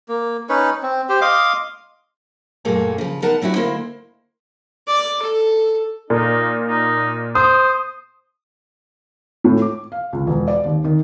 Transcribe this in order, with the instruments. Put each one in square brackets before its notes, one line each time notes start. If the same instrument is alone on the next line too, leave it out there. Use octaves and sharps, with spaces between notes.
[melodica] A#3
C#4 D#4 B4 C#5
C4
G4 C5
D#5 F5 C6 D6
[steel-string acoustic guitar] F#2 A#2 A3 A#3 G#4 A4
C#3 F3
B3 D#4 A#4 F#5 A5
F#3 C4 D#4 E4 F#4
D2 A#3 E4 C5 D#5
[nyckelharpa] D5
A4
[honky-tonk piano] A#2 [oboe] D#4
[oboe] D#4
[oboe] C5 [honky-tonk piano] D#6
[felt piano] A2
D6
F5
C#2
E1
D5
D#2
D#3